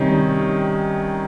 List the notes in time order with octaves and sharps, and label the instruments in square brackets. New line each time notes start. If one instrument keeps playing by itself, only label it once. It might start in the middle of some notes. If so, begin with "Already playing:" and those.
Already playing: [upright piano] C3 G3 C#4 [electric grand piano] D#3 D#4